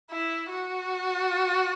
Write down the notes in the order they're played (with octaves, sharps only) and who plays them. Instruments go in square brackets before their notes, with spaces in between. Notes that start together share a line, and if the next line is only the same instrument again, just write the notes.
[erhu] E4
F#4